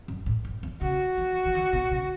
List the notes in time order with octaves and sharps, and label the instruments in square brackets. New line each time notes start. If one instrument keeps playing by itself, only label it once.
[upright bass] F#2
A2
G2
E2
[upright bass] C#3 [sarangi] F#4
[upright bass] E3
E3
D3
B2
C#3